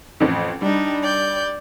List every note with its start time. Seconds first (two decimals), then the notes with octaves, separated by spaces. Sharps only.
0.20 A1 F2
0.62 G3 D4 D#4
1.03 D5 G6